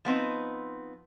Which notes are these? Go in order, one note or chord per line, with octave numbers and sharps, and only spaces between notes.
F3 B3 C4 D#4